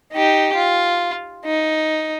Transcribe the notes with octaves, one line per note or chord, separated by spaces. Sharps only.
D#4 G4
F4
D#4